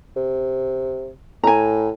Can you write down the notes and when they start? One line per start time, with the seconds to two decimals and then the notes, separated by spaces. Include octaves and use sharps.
0.16 C3
1.43 A2 G#5 A#5